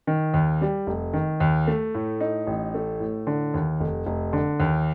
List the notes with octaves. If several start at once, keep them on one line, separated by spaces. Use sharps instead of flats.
D#3
D#2
G3
F1
D#3
D#2
A3
A2
D#4
A1
A3
A2
D3
D#2
F1
F1
D3
D#2